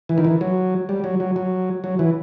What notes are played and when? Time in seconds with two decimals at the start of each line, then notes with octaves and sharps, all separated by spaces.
0.09 E3
0.18 D#3
0.24 E3
0.41 F#3
0.89 G3
1.04 F#3
1.20 F#3
1.36 F#3
1.84 F#3
1.99 E3